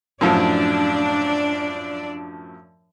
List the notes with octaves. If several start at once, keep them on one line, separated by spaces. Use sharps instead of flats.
F#2 A2 F3 D4 D5